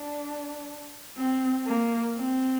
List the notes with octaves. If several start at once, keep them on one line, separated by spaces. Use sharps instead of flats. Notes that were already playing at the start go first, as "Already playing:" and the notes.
Already playing: D4
C4
A#3
C4